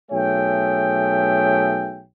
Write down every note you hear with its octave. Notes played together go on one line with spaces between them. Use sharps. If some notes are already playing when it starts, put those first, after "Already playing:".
B1 A3 G#4 C#5 E5 G5